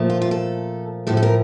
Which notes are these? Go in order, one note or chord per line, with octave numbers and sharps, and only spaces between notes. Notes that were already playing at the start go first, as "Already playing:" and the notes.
Already playing: A#2 F3 A3
F4
F4
A4
A2 F3 A3 A4
A4
A#4